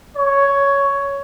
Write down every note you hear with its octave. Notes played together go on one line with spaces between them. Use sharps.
C#5